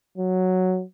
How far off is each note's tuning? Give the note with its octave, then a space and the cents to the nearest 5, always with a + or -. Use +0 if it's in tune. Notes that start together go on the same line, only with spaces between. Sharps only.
F#3 +0